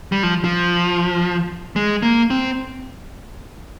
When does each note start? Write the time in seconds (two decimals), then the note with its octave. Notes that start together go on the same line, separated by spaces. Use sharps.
0.12 G3
0.23 F3
0.44 F3
1.76 G#3
2.03 A#3
2.30 C4